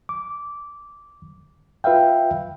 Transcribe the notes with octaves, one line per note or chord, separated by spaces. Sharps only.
D6
F4 B4 E5 F5 G5